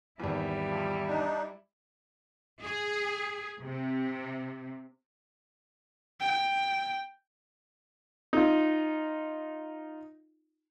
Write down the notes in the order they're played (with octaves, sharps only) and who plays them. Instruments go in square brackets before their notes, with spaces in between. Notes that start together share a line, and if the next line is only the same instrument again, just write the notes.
[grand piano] G#1 E2 [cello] G3 E4
[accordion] F3
D4 D#4
[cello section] G#4
C3
[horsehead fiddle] G5
[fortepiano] D#4 F4